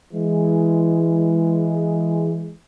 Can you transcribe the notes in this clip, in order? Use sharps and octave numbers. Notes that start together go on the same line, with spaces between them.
E3 G#3